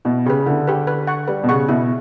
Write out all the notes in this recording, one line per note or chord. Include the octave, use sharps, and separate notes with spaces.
B2 E4
C#3 G4 B4
D3 E4
G4 B4
B4
F#5 C#6
G3 B4
B2
C#3 F#5 C#6
B2 E4